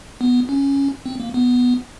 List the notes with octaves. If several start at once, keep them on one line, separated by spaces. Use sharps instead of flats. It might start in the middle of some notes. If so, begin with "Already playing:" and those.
B3
C#4
C4
A#3
B3